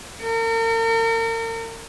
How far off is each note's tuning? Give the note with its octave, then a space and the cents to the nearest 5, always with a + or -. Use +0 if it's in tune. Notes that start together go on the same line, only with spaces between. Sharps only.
A#4 -40